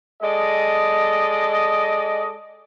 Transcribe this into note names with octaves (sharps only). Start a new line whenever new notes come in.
G#3 A4 D5 D#5